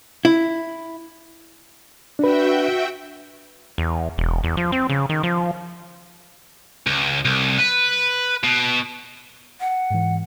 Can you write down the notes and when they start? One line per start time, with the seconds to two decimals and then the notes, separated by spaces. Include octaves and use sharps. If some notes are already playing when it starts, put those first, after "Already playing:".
0.25 E4
2.19 D4 F#4 B4 E5 G5
3.78 E2
4.18 E1
4.44 E2
4.57 F3
4.72 C4
4.90 C#3
5.09 D#3
5.23 F3
6.87 C#2
7.25 C2
7.58 B4
8.44 B2
9.61 F#5
9.90 G#2 E3